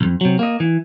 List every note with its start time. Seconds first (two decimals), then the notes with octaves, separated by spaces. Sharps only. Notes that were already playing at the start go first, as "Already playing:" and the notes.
0.01 C2 F2
0.21 C3 F#3
0.39 A#3 D#5
0.60 E3